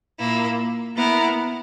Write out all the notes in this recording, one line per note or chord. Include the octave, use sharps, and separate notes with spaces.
A#2 A#3 E4
B3 E4 A#4